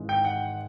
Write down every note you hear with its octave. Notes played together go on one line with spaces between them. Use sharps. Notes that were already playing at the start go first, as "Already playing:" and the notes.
Already playing: G#1 G#2 E3 G#3
G5
F#5